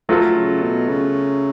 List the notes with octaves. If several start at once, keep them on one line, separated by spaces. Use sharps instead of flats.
F3 F#3 A3 F4 A4
C#3
B2
C#3